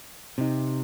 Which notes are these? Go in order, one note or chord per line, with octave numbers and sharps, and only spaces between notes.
C3 C4 D#4